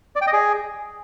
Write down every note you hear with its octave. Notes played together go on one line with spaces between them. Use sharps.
D5
G5
D#5
G#4